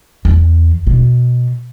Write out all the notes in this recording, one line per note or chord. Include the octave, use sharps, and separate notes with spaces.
E2
B2